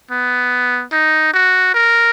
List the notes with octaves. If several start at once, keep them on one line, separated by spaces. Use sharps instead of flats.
B3
D#4
F#4
A#4